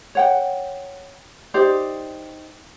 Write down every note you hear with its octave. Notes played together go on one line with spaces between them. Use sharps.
C#5 F#5 G5
D#4 G4 C5 D5